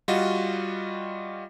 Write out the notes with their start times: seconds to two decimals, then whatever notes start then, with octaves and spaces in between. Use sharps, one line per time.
0.08 G3 F4 F#4 D#5